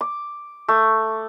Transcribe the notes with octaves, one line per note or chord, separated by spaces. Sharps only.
D6
A3